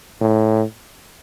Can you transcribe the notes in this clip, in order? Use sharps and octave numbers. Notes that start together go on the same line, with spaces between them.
A2